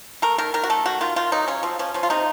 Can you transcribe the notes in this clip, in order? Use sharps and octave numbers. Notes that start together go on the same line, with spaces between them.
A3 A#4
D#3 A#4
D#3 A#4
F#4
A3 A4
D#3 F#4
D#3 F4
D#3 F4
F#3 D#4
C#3 C#4
F3 C4
F3 C#4
F3 C#4
F4
C3 D#4